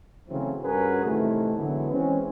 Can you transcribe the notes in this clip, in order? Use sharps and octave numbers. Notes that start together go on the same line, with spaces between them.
C#3 E3 F#3 A3 C4
G2 C#4 F#4 G#4 A#4 B4
A2 C3 D#3 E3 A3
D3 E3 F#3 G#3 B3 E4
E3 G#3 C4 C#4